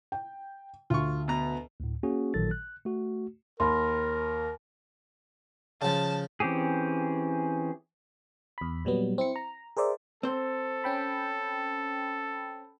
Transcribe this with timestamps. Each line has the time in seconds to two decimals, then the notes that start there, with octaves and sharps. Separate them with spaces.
0.12 G5
0.90 D2 F4 C#6
1.28 B2 B3 A#5
1.80 D2 A2
2.03 A#3 C#4 F#4 G#4
2.34 A1 A#2 D#3 F#3 A4 A6
2.51 F#6
2.85 A3 F#4
3.60 D#2 A#4 B5 C6
5.82 C#3 F3 A5
6.40 E3 C4 C#4 G4 G#4
8.58 E2 B5
8.85 A#2 F#3 G3 B3
9.18 C4 E4 C#7
9.36 A#5
9.77 G#4 A#4 C5 D5 E5
10.23 C4 A4 C5
10.84 C#4 G5 B5